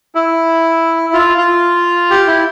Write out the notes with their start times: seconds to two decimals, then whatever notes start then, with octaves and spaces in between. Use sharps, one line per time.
0.15 E4
1.13 F4
1.38 F4
2.10 G4
2.27 E4